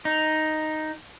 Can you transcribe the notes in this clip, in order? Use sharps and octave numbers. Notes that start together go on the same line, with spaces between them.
D#4